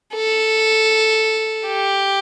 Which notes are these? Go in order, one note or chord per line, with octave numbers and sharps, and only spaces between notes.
A4
G4